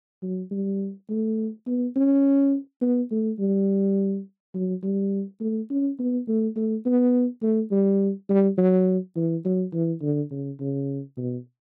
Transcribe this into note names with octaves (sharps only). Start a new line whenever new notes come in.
F#3
G3
A3
B3
C#4
B3
A3
G3
F#3
G3
A3
C#4
B3
A3
A3
B3
A3
G3
G3
F#3
E3
F#3
E3
D3
C#3
C#3
B2